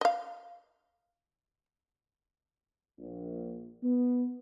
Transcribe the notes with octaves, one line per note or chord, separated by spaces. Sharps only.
D#5 F5
A#1
B3